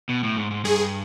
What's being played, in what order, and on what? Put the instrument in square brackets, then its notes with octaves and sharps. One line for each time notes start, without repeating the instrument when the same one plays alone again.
[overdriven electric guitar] B2
A2
G#2
G#2
[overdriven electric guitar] G2 [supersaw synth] G#4